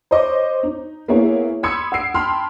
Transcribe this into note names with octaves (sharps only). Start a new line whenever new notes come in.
C5 C#5 D#5 C#6 D6
D#4
A#3 B3 E4 G#4 C#5
B5 C6 D#6 E6 G#6 C#7
F#5 E6 C7 D7
G5 A5 B5 C6 F6